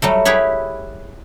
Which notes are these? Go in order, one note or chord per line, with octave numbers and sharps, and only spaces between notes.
F#3 G3 A3
E4 G4 G#4 B4 C#5